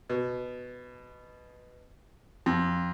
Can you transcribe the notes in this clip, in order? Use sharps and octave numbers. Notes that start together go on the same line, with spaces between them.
B2
F2